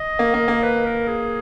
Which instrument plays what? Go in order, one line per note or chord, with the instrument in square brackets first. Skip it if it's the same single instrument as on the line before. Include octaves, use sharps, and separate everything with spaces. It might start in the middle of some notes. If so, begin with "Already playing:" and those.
Already playing: [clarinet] D#5
[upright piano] A#3
A#3
A#3
[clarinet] B4
A#4
G#4